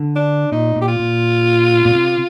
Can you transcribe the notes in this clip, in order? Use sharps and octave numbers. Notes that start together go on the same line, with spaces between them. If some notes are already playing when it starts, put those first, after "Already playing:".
Already playing: D3
D4
A#2 D#4
A#2
G4
F4
A#2
A#2
C3